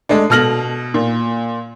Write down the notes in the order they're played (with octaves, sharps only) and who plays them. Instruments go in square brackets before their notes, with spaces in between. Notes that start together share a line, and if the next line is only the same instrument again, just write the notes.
[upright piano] G#3 A3 D4
B2 A4 F6 A#6 F#7
A#2